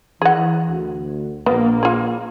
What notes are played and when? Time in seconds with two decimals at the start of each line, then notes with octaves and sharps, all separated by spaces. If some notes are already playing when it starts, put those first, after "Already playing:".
0.22 E3 G#4 F#5
0.67 D2
1.46 A#1 A#3 B3
1.83 F4 G#4